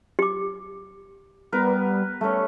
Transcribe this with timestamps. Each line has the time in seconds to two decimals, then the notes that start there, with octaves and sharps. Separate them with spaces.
0.19 G4 D6
1.52 G3 B3 A#4 B4
2.21 G3 A3 C#4